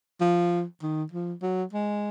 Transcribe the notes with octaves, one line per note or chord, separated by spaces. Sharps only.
F3
D#3
F3
F#3
G#3